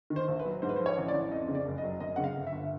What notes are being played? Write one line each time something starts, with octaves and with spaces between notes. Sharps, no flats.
D#3
C5
A#1
B4
F#3
G#2 C5
B4
C5
F3
C#5
A1
D5
A1
F2 D#5
C#3
D5
F#1
D#5
F#3
F#2 D#5
C#3 F#5
F5
G1
E5
G1